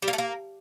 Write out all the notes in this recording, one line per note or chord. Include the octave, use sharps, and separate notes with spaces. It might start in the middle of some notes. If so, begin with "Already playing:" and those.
G3
A#3
A3
A#3